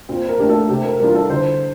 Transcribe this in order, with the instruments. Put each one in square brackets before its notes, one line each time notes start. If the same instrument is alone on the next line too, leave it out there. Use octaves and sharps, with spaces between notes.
[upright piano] A#2 [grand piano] C4
[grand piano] A#4
[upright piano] A3 D4 G4
[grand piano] A4
[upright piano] C3 [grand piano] G4
[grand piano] A#4
[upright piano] E3 G3 D4 F4 [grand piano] A#4
[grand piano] A4
[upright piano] D3 [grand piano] C5